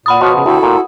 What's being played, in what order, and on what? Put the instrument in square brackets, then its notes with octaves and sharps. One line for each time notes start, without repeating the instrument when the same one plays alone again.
[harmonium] A#2 [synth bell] F#5 B5 D#6
[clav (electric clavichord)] B2 F3 B3 [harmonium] F#4 C#5
[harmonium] C#3
[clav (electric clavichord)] D2 G4 [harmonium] E4 F#4 A4
[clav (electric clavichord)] A#2